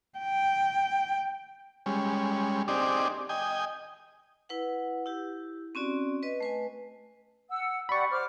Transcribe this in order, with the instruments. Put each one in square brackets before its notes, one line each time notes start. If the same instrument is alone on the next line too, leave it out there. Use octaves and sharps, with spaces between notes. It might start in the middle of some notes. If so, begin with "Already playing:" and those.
[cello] G5
[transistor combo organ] G3 G#3 C#4
C4 D4 D#4 G4 G#4 D5
D#5 G5 G#5
[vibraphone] E4 B4 F#5
E4 G4
C4 C#4 F#4 D5
B4 D#5
A3 B4 G#5
[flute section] F#5 E6
[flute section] G4 D5 F#5 [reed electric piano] B5 C#6
[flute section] C5 D6 F6